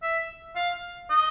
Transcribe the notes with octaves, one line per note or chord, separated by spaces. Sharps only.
E5
F5
D#5